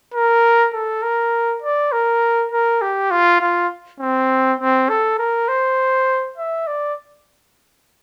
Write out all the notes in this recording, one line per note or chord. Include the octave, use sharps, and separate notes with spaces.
A#4
A4
A#4
D5
A#4
A#4
G4
F4
F4
C4
C4
A4
A#4
C5
E5
D5